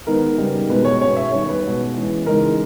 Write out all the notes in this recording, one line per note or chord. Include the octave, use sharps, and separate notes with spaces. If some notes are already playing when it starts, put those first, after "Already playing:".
D#3 G#3 B3 D#4 A#4
C#3 G3 B3 D#4
B2 G#3 B3 D#4 B4
C#5
B2 G#3 C#4 C#5
E5
D#3 G3 C#4 C#5
B4
B2 G#3 B3
E3 G#3 C#4
C#3 E3 G#3 D#4 A#4